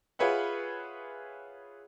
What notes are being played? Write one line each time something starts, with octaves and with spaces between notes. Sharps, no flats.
F4 G#4 B4 C#5 E5 F#5